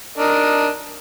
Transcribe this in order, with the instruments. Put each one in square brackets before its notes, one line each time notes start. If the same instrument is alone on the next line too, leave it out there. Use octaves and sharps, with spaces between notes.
[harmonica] D4 A#4 D#5